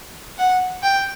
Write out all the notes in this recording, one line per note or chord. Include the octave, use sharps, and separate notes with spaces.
F#5
G5